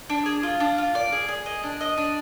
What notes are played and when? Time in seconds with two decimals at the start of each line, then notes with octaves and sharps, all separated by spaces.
0.10 D4
0.26 G#4
0.43 F4
0.60 D4
0.78 F4
0.95 D5
1.12 G#4
1.28 G#4
1.46 D#5
1.64 D4
1.81 D#5
1.97 D4